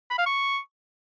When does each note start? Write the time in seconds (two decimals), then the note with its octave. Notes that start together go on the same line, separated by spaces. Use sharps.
0.10 B5
0.18 F5
0.26 C#6